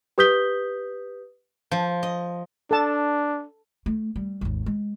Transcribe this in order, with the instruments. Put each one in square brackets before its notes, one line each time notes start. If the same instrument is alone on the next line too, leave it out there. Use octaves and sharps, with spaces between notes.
[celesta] G4 B4 D#6 G6 B6 G7
[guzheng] F3
D#5
[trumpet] D4 [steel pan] A4 A5
[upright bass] A3
G3
G#1 D#2
G#3